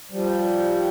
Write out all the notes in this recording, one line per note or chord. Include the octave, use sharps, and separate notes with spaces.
F3 G3